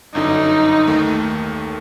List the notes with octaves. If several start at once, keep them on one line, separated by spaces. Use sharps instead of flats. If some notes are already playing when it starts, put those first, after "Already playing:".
G1 F#2 D3 D#4
D#2 D#3 A3